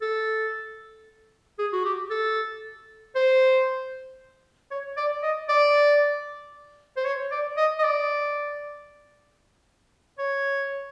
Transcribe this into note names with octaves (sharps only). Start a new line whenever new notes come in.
A4
G#4
F#4
G4
A4
C5
C#5
D5
D#5
D5
C5
C#5
D5
D#5
D#5
D5
C#5